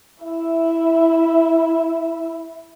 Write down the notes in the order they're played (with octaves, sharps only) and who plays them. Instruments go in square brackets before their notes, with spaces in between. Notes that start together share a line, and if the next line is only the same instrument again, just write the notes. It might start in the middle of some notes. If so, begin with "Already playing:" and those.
[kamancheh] E4 E5